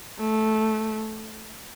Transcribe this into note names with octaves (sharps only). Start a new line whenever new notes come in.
A3